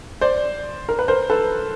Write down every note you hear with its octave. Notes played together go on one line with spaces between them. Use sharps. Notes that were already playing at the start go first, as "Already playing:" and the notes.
C5 D5
A#4
B4
A#4 C5
A4 B4